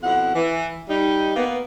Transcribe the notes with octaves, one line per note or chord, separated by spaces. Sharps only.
F2 B2 E4 F#5
E3
G3 D#4
A#3 B3